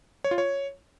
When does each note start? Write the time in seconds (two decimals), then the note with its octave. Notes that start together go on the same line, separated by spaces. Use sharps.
0.24 C#5
0.31 F4
0.38 C#5